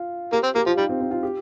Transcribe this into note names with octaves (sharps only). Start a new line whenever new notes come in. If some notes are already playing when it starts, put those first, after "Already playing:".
Already playing: F4
A#3 G4
C4
A#3 G4
F3 F4
G3 D#4
C4
C4
F4
G4